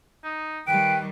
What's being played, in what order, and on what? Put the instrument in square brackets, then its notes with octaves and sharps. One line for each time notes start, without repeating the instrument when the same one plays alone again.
[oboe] D#4
[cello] D#3 G3 [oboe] B4 [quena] G5 [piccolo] D7